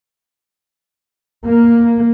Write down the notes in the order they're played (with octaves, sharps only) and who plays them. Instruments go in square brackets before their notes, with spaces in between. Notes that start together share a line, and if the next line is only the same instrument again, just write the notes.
[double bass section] A#3